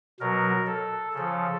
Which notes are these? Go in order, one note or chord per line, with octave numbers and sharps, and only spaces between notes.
B2 F#3 A#4
A4
C#3 F3 A4